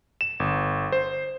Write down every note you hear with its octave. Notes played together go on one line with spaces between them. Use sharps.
E7
G1
C5